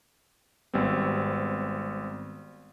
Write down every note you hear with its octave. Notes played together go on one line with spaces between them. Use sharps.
G#1 G3 B3 C4